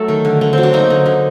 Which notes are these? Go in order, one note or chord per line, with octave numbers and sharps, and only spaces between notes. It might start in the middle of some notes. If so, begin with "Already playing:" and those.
Already playing: F#3 A3 A4
D#3
D3
D3
F#3 C4
D4
A#3 D#4
D3
D3